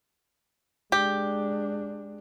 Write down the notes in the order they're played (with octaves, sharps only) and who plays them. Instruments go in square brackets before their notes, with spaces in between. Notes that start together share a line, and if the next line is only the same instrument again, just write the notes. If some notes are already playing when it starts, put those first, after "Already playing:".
[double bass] G#3 D4 [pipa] G4